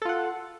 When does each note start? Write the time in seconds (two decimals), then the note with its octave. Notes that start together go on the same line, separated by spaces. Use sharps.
0.02 A4
0.05 F4
0.09 F#5